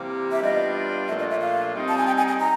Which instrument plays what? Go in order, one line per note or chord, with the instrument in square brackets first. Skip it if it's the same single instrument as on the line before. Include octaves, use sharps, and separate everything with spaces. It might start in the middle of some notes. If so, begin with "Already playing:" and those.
Already playing: [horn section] C3 E3 G3 A#3
[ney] E5
[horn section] G3 B3 D4 F4 [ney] D#5
[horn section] A#2 F3 A3 D4 F4 [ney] E5
[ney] D#5
E5
F5
[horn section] G3 C4 D#4
[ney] A5
G#5
G5
G#5
G#5
A#5